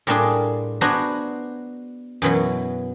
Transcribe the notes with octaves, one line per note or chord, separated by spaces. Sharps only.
A2 G3 A#3 D4 F4 G#4
B3 D4 F#4 C5 G#5 A#5
F#2 B2 E3 F#3